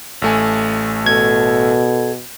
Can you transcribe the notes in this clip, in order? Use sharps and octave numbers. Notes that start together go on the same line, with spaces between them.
A1 A3 G#5
B2 A4 G#6